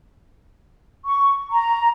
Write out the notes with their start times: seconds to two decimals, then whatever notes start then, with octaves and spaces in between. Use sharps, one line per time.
1.05 C#6
1.51 A#5